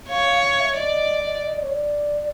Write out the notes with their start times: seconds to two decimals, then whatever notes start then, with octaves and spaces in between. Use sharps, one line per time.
0.09 C#5 F5
0.26 F5
0.43 F5
0.59 E5
0.77 D5 D#5
1.45 D#5
1.53 D5
1.62 C#5
1.71 D5